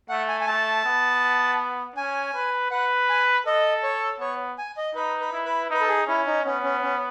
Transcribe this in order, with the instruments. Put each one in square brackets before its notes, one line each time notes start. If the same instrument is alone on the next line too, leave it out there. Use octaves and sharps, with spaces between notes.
[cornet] A3 [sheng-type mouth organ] F#5
[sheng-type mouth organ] G#5
G#5
[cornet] A3 [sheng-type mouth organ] A5
[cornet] B3
[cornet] C#4 [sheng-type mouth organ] G#5
[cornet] B4
[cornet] B4 [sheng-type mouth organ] F#5
[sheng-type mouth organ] G#5
[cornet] A4 [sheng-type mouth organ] D#5
[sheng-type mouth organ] C#5
[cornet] B3 [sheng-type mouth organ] C#5
[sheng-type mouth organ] G#5
D#5
[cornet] D#4 [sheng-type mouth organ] B4
[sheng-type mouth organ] B4
[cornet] E4
[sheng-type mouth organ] B4
[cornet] D#4 [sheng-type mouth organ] B4
[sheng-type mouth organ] A4
G#4
[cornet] C#4 [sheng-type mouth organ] E4
[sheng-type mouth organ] D#4
[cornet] B3 [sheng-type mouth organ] C#4
[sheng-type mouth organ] C#4
C#4